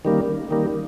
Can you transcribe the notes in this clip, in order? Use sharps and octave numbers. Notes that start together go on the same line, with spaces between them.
D#3 G3 A#3 C#4
D#3 G3 A#3 D#4